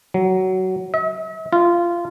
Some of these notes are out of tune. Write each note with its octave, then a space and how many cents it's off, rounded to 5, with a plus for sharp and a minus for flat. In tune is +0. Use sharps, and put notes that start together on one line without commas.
F#3 +15
E5 -45
F4 -15